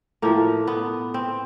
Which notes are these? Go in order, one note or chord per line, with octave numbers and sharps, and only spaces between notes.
A2 F3 A#3
B3
C4